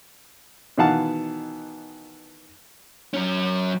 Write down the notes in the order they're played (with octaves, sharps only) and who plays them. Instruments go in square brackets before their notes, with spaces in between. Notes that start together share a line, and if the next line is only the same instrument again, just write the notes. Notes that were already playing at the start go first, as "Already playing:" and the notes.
[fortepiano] B2 D#3 E3 F5 F#5 A5
[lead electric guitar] F#3 C#4